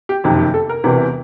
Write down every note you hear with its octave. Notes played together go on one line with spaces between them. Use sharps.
G4
F#1 F2 C3 D#3
G4
A4
A#4
E1 E2 C3 E3